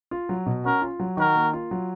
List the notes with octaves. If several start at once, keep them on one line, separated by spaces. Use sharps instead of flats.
F4
F#3
B2
C#4 F#4 A#4
F4
F#3
D#3 F#4 A#4
A#3
F4
F#3